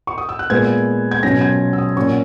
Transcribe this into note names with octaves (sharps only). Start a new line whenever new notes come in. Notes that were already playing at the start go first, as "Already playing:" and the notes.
C#6
D#6
E6
F#6
A#2 G#3 B3 G#6
G#6
B2 F#3 C#4 A#6
G#6
E6
D#6
A#2 A#3 C#4 C#6